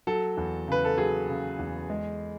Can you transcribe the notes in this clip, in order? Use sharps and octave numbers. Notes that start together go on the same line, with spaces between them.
F#3 A4
E2
C#3 B4
A4
F#3 G#4
C#3
E2
G#3